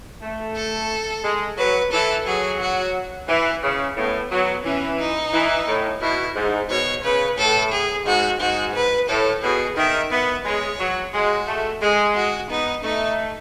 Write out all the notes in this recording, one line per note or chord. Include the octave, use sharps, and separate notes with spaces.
A3
A4
G#3
F#3 B4
E3 A4
F#3 G#4
F#4
E3 E4
C#3
A2 B3
F#3 B3
E3 C#4
D#4
E3
A2
B2 E4
G#2
B2 C#5
C#3 B4
A2 A4
G#4
G#2 F#4
G#2 F#4
B4
A2 A4
B2 G#4
D#3 E5
B3 E5
G#3 C#5
F#3
G#3 F#4
A3
G#3 G#4
F#4
B3 D#4
A3 D#4